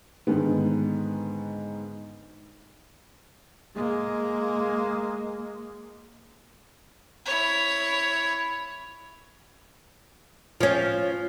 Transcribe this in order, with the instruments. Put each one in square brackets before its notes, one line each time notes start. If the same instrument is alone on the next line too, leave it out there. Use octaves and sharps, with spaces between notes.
[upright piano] G#2 D3 D#3 B3
[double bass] G#3 A#3
[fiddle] E4 C#5
[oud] F3 C#4